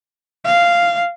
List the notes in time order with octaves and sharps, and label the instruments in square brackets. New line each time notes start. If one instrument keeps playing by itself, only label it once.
[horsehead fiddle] F5